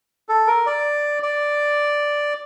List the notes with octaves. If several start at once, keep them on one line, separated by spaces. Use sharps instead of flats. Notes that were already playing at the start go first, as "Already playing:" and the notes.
A4
A#4
D5
D5